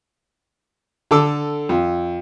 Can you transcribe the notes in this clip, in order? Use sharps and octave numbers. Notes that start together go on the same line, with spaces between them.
D3 A4 D6 E6
F2